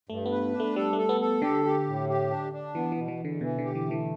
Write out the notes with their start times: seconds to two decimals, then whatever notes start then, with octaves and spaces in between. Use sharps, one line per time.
0.09 G2 A3
0.26 B3
0.32 B4
0.54 D4
0.60 A3
0.76 G3 A4
0.93 A3 A4
1.09 B3
1.21 A4
1.42 D3 G4
1.64 G4
1.87 A2
2.09 G4
2.31 D4
2.53 D4
2.75 E3 B3
2.92 B2 E3
3.08 E3
3.20 E2
3.25 D3
3.41 B2 E3
3.58 D3
3.64 G4
3.75 E3
3.86 A3
3.91 E3